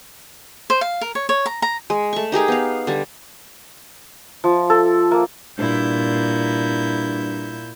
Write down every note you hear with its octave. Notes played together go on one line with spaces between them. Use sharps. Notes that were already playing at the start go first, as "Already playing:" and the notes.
C5
F5
A#4
C#5
C#5
A#5
A#5
G#3
A3 C#6
D#4 G4 G#4 A#4
B3 F5
D3 G3
F3
A4
A#3
G2 A#2 E4 G6